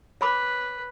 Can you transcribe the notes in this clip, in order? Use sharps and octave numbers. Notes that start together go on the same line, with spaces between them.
B4 C#5 B5 D6